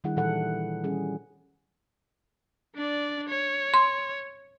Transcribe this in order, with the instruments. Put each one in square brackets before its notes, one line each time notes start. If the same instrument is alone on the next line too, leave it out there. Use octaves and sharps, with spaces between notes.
[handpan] D#3 G3 D4 E4 G#4 F#5
A#2 E3 E4 A4 F#5
G3 C#4 G#4
[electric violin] D4 D5
C#5
[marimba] C6